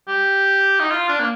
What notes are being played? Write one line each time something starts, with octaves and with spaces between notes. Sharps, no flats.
G4
D#4
F4
D4
A#3